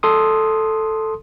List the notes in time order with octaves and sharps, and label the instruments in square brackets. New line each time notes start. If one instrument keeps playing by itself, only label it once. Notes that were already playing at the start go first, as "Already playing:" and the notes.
[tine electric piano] A4 C6 D#6